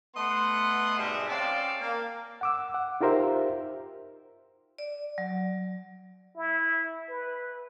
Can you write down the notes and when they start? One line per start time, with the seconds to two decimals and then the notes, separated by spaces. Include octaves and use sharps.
0.16 A3 B3 D#5 F#5 C6
0.97 G#2 B2 G3 G#3 G#4 E5
1.28 C4 C#4 D5 F5 A5
1.80 A#3
2.41 F#5 D6 E6
2.74 F#5
3.01 D#4 F4 G4 A#4 C5 E5
4.78 D5
5.18 F#3
6.37 E4
7.09 B4